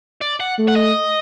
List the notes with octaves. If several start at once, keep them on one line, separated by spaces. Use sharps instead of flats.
D5
F#5
A3
F#5
D#5